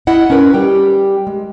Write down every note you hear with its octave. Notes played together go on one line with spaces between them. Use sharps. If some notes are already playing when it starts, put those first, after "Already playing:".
E4 D#5 F#5
C#4 D#4 A#4 B4
G3 G4 G5
G#3